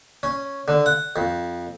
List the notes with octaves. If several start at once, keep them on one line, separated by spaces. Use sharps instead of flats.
C#4
D3
F#5
F2